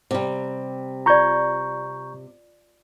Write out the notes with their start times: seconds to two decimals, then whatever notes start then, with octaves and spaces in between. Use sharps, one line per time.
0.11 C3 G3
1.06 F4 D5 A#5 C#6 G6